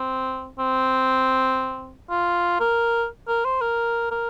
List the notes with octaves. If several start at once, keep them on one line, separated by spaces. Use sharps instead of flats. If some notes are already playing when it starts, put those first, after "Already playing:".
Already playing: C4
C4
F4
A#4
A#4
C5
A#4
A#4